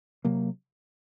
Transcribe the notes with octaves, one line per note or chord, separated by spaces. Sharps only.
C3 F#3 A#3